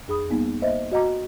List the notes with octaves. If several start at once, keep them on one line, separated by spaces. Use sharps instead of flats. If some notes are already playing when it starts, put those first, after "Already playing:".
F2 G#4 B5 D#6
G3 A#3 B3 D#4
A#3 C5 D#5 E5
F#4 D#5 F#5 A#5 D6